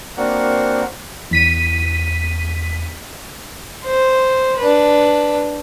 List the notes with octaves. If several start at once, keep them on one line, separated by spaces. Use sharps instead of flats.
A#3 C4 D4 F#4 A#4 F#5
E2 B6 D#7
C5
D4 B4